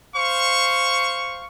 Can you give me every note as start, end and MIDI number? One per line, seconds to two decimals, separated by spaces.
0.16 1.47 72
0.16 1.47 77
0.16 1.47 85